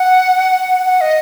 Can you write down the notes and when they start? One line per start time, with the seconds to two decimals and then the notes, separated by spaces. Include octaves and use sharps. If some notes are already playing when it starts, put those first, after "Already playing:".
Already playing: F#5
0.86 F#5
1.01 D#5